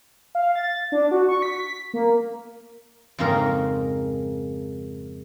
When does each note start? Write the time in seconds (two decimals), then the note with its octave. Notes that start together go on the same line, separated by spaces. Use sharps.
0.35 F5
0.55 A6
0.92 D4
1.11 F#4
1.28 C#6
1.42 B6
1.94 A#3
3.18 F2 G#2 C#3 A#3 A#4